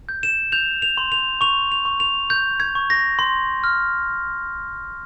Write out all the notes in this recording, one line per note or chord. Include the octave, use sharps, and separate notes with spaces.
G6
E7
G6 F7
F7
C6
F7
C#6 F7
F7
C#6
F7
G6
G#6
C#6
A#6
C6
F6